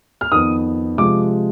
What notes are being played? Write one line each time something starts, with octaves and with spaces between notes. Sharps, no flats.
F6
F2 D#3 B3 D#6
C3 F3 G#3 D6